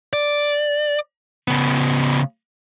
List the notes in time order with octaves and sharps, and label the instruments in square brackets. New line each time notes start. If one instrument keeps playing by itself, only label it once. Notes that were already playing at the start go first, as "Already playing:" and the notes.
[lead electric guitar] D5
C#3 B3